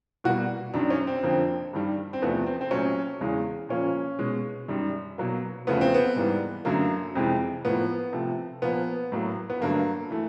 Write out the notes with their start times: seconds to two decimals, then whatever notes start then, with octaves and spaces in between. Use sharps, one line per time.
0.24 B2 G3 A#3 F#4
0.74 F#2 D#3 F#3 D4
0.90 C#4
1.07 C4
1.23 F2 D3 F3 A#3
1.73 G2 D#3 G3
2.13 C4
2.22 E2 C3 F3 A3 B3
2.46 C4
2.61 C4
2.71 A#2 F#3 A3 C#4
3.20 E2 C#3 E3 G#3
3.69 A#2 F3 A#3 C#4
4.19 B2 G#3
4.68 F#2 D#3 G3
5.18 B2 F#3 A#3
5.67 E2 C#3 F3 A3 B3
5.81 C4
5.94 B3
6.16 G#2 E3 G3 A#3
6.65 F#2 D3 F#3 A3 A#3
7.15 F2 C3 E3 G#3
7.65 A2 F3 A#3 B3
8.13 C3 F3 A3
8.62 A#2 F3 A#3 B3
9.12 A2 F#3 A#3
9.50 B3
9.61 G2 D3 F#3 A3 A#3
10.10 E3 A3